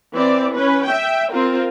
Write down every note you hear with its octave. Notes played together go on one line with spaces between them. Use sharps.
E3 C4 D5
C#4 B4
E5 G5
C4 F4 A#4